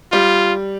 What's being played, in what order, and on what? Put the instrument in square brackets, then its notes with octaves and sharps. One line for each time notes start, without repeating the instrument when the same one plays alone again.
[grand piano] G3 [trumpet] F4